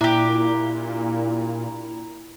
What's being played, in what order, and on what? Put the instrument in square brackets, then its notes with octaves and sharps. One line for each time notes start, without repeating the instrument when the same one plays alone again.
[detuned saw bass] A#2 [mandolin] D4 G4 [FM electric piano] E4 A#5